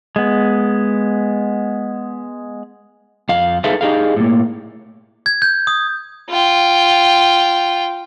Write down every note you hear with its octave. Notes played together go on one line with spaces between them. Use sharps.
G#3 B3
F2 F5
D#4 G#4 A4 B4 E5 F5
D#4 G4 G#4 F5
A2 A#3
G#6
G6
D#6
F4 G5